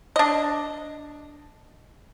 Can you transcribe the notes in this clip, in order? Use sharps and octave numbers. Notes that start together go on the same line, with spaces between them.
D4 D#5